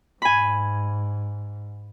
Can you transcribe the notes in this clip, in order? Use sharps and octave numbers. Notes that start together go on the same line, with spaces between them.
G#2 G#5 B5